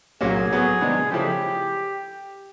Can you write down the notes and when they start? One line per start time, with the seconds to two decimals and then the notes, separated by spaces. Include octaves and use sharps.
0.21 C2 A#2 F#3 A#3 C#4 G#4
0.51 A2 F#3 B3
0.81 C3 D#3 G#3 B3 D4
1.11 C#3 F3 A3 C#4 E4 G4